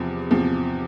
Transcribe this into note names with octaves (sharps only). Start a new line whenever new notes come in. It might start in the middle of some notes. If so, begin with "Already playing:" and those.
Already playing: E2 C3 F3
E2 C3 F3